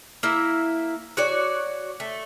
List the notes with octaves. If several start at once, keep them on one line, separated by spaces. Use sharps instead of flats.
A#3 E4 E5
F#4 C#5 D5
A3